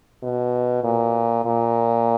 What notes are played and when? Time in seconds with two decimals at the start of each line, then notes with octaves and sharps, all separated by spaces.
0.23 B2
0.83 A#2
1.45 A#2